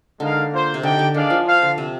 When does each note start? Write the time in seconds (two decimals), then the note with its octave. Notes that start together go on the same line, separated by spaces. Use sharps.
0.20 D3 G#3 D#4 A#4 F5
0.52 A#3 F4 C5
0.74 C3
0.83 D3 D#4 G4 D5 G5
0.99 D3
1.14 D#3 D4 G#4 D5 F5
1.30 F3
1.46 F4 C5 F5
1.62 D3
1.78 C3 C4